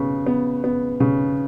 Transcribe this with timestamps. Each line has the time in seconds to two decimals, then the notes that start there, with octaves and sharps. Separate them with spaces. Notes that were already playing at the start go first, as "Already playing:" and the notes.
Already playing: C#3 B3
0.26 B3
0.64 B3
1.00 C#3